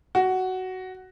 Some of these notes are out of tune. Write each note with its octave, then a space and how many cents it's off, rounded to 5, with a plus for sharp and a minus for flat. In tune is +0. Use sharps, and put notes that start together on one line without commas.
F#4 +10